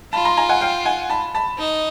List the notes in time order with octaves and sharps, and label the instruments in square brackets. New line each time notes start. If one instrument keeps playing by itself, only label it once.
[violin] F4 [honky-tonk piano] A5 B5
[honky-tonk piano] A#5 C6
G#5 A#5
F#5 G#5
F5 G5
F#5 G#5
A5 B5
A5 B5
[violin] D#4